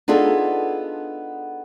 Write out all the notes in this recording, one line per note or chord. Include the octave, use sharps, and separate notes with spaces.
B3 D4 D#4 F4 G#4 A4